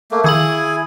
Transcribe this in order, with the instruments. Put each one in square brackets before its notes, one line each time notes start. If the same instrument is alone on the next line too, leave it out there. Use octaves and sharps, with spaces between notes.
[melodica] A3 A#3
[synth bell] D#3 F5 F#7 [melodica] E4 G#4 G#5